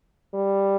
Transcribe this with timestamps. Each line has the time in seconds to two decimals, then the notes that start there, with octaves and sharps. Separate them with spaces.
0.34 G3